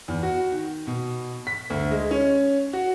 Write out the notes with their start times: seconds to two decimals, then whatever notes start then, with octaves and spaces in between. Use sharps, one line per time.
0.08 E2
0.23 F#4
0.52 D#3
0.87 B2
1.47 B6
1.70 D2
1.91 G#3
2.11 C#4
2.73 F#4